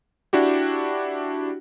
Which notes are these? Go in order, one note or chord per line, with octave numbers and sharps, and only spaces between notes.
D4 E4 F#4 G4